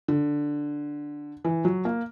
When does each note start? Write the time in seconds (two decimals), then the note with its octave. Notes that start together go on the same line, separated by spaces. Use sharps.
0.08 D3
1.45 E3
1.65 F#3
1.85 A#3